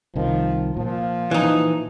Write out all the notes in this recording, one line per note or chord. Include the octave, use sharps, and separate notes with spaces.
C2 D#3 F3
A#2 F3
E3 D#4